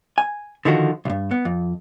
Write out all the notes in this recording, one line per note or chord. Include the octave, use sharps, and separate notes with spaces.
G#5
D3 D#3 F3 F#4
B1 G2
B3
F2